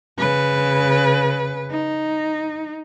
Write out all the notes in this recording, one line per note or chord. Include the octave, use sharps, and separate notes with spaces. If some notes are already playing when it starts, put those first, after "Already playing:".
C#3 B4
D#4